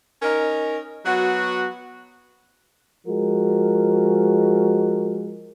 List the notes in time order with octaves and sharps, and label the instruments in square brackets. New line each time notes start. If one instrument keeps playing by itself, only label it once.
[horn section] C#4 D#4 A#4
F#3 B3 F#4
[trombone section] F3 G#3 F#4 A#4